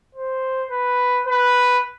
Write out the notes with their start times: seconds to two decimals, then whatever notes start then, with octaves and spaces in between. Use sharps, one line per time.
0.15 C5
0.71 B4
1.27 B4